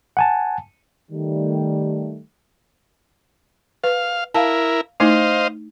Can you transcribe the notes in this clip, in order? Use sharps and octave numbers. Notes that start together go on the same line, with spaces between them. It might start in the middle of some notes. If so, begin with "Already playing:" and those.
F#5 G#5 A5
D#3 G3 A3
B4 F5
E4 A#4 F5 A5
A3 D#4 E4 C5 D#5 F5